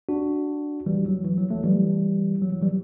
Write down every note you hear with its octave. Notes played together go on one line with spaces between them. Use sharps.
D4 F#4
E3 G3
F#3
E3
F#3
F#3 A3
E3 G3
F#3
F#3
E3 G3